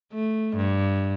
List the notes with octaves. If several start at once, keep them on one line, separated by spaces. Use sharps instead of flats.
A3
G2